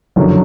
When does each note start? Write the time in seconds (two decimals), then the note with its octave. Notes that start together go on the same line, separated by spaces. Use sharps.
0.16 F#1 F2 D3 F#3